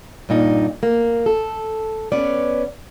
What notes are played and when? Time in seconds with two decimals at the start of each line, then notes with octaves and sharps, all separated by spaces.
0.29 G2 A#2 D#4
0.83 A#3
1.26 A4
2.12 B3 C#4 D5